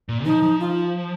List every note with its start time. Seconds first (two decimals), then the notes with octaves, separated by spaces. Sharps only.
0.09 A#2
0.25 F3 D#4
0.42 F3
0.60 F4